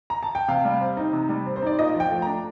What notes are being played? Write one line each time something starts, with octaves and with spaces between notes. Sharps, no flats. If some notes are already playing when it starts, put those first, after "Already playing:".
A#5
A5
G5
C3 F5
G3
C4
D#4
C3
G3
C4
C5
D#4 D5
A#2 D#5
F3
G5
A3
A#5
D4